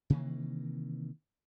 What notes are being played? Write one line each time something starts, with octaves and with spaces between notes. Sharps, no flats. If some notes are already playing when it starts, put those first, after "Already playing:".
C3 D#3 E3 A#3